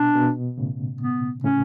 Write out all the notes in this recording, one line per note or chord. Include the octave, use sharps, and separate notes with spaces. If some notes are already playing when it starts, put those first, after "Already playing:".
Already playing: B2 D4
B2
A2 C#3
B3
A2 C#3 C#4